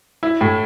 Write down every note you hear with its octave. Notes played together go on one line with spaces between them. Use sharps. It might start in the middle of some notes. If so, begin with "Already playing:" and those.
E4
A2